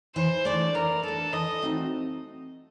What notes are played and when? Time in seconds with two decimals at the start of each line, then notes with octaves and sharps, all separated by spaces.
0.15 E3 C5
0.45 A3 D4 D5
0.75 E3 A#4
1.03 A3 D4 A4
1.33 E3 D#5
1.62 A3 C4 D#4 F#4